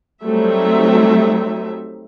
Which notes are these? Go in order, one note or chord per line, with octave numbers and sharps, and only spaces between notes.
F#3 G3 A3 C4 D#4 E5